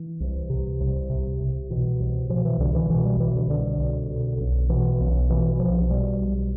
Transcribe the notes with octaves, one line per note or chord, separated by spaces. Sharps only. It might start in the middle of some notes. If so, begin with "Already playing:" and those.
Already playing: E3
C2
C3
C2
C3
C2
B2 E3
C2
B2 F3
E3
C2 D3
E3
B2 E3
G3
C2 E3
D3
B2 D3
C2
B2
B1
B2 E3
B1
B2 E3
B1 F3
B2 G3
B1